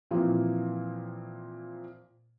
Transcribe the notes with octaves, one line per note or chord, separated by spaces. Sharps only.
A#2 E3 F3 A#3 C4